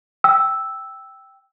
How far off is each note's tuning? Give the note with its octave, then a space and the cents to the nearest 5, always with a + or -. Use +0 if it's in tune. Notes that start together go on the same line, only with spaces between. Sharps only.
G5 -5 E6 +0